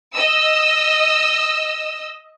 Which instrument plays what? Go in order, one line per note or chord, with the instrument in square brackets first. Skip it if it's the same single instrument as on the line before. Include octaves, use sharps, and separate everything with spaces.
[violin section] D#5 E6